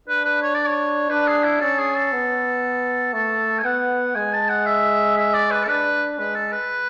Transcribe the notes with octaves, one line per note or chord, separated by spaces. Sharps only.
D4 B4
B4
C#5
D5
C#5
D4 B4
G#4
E4
C#4 A4
G#4
A4
B3
A3 A4
G#5
B3 F#5
G#3 G#5
A5
F#5
E5
E5
D5
B4
A4
D4 B4
G#3 B4
A4
B4